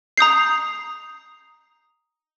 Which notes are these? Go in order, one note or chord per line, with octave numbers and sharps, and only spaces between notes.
A#5 D#6 G6 C7